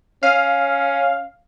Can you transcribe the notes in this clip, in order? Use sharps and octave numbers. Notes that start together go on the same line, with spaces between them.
C#4 F5